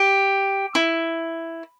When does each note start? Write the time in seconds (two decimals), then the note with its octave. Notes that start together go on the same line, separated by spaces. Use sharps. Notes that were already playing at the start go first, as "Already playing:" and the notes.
Already playing: G4
0.75 E4